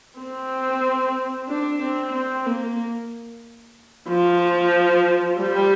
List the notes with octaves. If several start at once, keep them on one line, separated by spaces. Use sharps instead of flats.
C4
D4
C4
C4
A#3
F3
G3